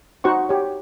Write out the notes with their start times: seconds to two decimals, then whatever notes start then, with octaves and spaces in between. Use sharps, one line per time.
0.24 D#4 F#4 C5 F#5 C#6
0.49 G4 C#5